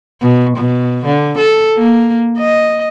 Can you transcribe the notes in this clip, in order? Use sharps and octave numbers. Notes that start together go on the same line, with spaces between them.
B2
B2
D3
A4
A#3
D#5